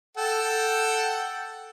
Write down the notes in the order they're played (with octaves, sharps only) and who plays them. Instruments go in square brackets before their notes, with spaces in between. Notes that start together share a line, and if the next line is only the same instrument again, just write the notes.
[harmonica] A4 F#5 G5